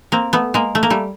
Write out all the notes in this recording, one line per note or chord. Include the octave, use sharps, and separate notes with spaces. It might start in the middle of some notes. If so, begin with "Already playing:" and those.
A#3 C4
A3 B3
G#3 A#3
A3
A#3
G3 A3